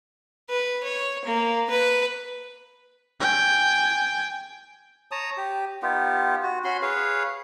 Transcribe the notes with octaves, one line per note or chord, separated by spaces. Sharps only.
B4
C#5
A#3
B4
G5 G#5
C#5 A5 A#5 D#6
G4
B3 D#4 F4 G4
F#4
C#4 F#4 B5 C6
G#4 B4 C#5 F5